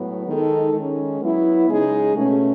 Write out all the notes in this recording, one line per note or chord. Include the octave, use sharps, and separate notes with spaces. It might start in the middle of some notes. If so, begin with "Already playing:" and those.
Already playing: A2 F#3 B3
D#3 G#3 D#4 A4
D#3 G#3 C#4
F#3 B3 E4
C#3 G#3 D#4 G#4
B2 A3 C#4